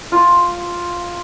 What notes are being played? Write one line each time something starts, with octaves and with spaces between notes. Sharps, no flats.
F4